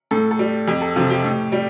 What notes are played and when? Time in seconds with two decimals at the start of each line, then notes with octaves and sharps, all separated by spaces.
0.11 A2 A4
0.31 A4
0.39 G3
0.68 F2 G4
0.82 A4
0.96 C3 F3 F4
1.10 G4
1.24 A2
1.52 G3